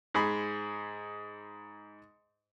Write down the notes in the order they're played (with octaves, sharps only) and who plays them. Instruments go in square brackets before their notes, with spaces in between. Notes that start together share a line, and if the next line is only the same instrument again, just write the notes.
[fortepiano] G#2 G#4 B5